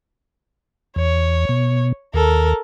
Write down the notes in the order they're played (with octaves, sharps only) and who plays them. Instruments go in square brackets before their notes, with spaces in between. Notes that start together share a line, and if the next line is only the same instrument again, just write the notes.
[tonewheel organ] E2 [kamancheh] C#5
[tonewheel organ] B2
[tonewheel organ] D#2 [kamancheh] A4 A#4